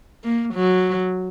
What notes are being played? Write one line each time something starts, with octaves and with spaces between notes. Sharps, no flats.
A#3
F#3